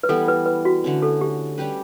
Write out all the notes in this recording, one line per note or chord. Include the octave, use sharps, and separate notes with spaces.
B4
E3 G3 B3 E4 A4
B4
B4
F#4
D3 A3 C#4
A4
G4
G3 C#4 G4 B4